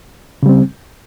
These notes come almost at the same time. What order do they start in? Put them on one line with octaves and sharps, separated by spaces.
C#3 G3 C4